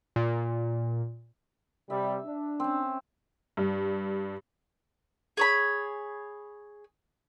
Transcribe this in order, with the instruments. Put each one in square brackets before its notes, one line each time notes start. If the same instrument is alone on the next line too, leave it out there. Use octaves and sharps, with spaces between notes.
[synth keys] A#2
[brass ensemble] C3 G3 [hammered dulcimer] E5
[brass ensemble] D4
[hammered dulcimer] C4 C#4
[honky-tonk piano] G2
[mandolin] G#4 C#5 B5